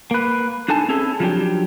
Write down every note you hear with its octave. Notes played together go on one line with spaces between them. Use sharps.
A#3 B4
D4 D#4 A4 G#5 A5
C4 C#4 E4 G#4 A4
F3 F#3 D4 G4